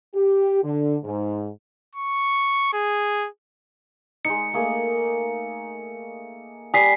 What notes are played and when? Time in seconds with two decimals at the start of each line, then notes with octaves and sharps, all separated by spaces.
0.15 G4
0.62 D3
1.04 G#2
1.95 C#6
2.73 G#4
4.25 G#3 D#4 C#7
4.53 A3 A#3 G#4
6.74 G3 D5 G#5 D#6 B6 C7